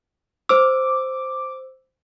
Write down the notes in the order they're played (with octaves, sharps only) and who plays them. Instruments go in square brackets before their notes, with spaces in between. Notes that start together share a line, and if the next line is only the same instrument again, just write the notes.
[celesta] C5 E6 [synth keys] D6